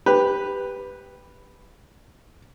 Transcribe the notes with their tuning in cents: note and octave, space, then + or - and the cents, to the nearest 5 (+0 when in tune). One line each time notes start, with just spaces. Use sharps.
G4 +10 B4 +0